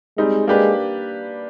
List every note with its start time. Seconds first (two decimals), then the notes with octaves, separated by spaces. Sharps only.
0.17 G3 G#3 C4 D#4
0.47 G#3 A#3 D4 G4 B4